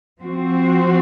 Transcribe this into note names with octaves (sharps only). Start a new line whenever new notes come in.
F3 C4 F#4